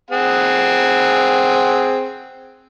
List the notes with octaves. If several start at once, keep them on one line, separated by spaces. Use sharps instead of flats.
C4 G#4 F#5